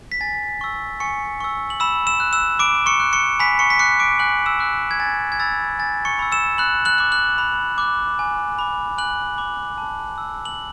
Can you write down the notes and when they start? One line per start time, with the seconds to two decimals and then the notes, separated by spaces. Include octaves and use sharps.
0.12 B6
0.21 G#5 A6
0.61 C#6 E6
1.00 G#5 C#6 C#7
1.41 C#6 E6
1.70 F#7
1.80 B5 E6 E7
2.07 E6 E7
2.20 F#6
2.33 E6 E7
2.59 B5 D6 D7
2.86 C#6 C#7
3.00 F#6
3.13 C#6 C#7
3.39 G#5 B5 B6
3.59 C#6 C#7
3.70 B6
3.79 C#6 D6 F#6 C#7
4.00 D6 D7
4.19 G#5 F#6 F#7
4.46 E6 E7
4.60 D6 F#6
4.91 G#6
5.00 G#5 A6
5.32 G#6
5.40 B5 E6 A6
5.79 G#5 A6
6.05 C#6 C#7
6.19 B5 E6
6.32 E6 E7
6.58 B5 F#6 F#7
6.85 F#6 F#7
6.98 D6 F#6
7.12 F#6 F#7
7.38 B5
7.78 D6 F#6
8.19 G#5
8.59 B5 D6
8.98 G#5 F#6 F#7
9.38 B5 D6
9.78 A5
10.18 E6
10.45 F#7